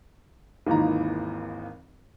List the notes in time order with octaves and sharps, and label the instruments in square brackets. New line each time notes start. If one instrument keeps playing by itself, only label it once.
[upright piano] G#1 D#2 E3 D#4 F4 A#5